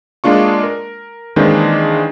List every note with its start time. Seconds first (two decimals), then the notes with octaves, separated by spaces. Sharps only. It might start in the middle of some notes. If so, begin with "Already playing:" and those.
0.24 G#3 A#3 D4 F4 C#6
0.63 A#4
1.36 D#3 E3 G#3 A#3 C4 D4